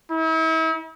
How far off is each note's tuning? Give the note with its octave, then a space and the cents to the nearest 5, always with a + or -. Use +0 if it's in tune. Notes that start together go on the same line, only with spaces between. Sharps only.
E4 -40